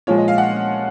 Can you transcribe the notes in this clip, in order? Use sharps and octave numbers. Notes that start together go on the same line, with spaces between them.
A#2 F3 G#3 C#5
D#5
F5
F#5